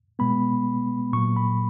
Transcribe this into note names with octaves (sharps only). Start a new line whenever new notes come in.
B2 G#3 B3 B5
A#2 F#3 A#3 C#6
B5